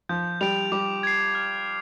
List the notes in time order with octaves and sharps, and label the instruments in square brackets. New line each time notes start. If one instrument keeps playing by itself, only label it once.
[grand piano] F3 [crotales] G6
[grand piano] G3 [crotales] D7 F7
[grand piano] G3 [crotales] D6
[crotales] G#6 C7
F6